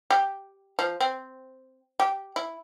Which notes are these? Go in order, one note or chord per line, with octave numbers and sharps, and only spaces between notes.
G4
F3
C4
G4
E4